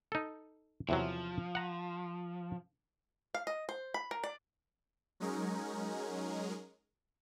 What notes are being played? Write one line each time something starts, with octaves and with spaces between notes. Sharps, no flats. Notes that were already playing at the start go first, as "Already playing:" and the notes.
D#4 A4
E2 C3 F3 F#3
F#5 A#5
F5
D#5
C5
B5
A#4
D5
F#3 G#3 C#4 D#4 G#4 A#4